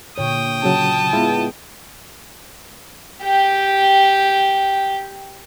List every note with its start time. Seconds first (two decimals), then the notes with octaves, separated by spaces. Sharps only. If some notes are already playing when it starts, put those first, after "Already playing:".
0.18 A#2 D3 C#5 G5 D#6
0.63 C#3 F#3 A5
1.13 G#3 B3 E4 F4
3.24 G4 G5